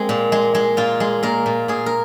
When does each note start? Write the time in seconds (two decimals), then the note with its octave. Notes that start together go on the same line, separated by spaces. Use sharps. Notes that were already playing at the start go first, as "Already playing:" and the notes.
Already playing: G#3 A#3 C4
0.09 A#2
0.32 G#3
0.55 G#3
0.77 A#2 F4
1.00 G#3
1.23 A#2 A#4
1.46 A#2
1.68 A#2 G#4
1.86 A#4